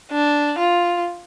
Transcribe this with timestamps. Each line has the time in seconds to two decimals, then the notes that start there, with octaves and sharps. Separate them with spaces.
0.11 D4
0.58 F4